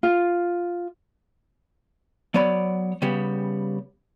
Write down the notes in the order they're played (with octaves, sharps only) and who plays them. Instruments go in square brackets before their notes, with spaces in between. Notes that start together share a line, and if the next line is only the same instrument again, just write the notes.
[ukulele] F4
[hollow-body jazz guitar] F#3 B3 C#5 D5 B5
C#3 G3 B3 G4